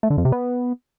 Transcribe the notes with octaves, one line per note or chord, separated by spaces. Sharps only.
A3
D3
F2
C3
B3